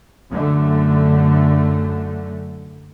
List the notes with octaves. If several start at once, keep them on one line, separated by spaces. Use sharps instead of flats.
F#2 D3 A3